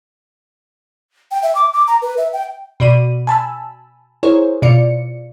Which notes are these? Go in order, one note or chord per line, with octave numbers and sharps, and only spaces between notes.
G5
E5
D6
D6
A#5
B4
E5
G5
B2 F#4 D5 B5 D#7
G#5 A5 B5 E6
E4 G#4 A#4 C5 C#5
B2 F4 D5 C#7